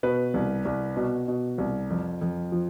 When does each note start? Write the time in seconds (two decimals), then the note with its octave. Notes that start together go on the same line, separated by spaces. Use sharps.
0.03 B2 B4
0.34 C2
0.65 C2
0.96 B2
1.28 B2
1.58 C2
1.90 F2
2.21 F2
2.52 F3